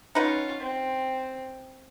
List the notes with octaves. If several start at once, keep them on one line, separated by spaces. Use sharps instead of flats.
C#4 D#4 F4 B4 F#5
C4